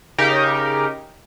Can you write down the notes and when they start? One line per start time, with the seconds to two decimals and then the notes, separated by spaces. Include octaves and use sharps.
0.18 C#3 D#4 G4 A#4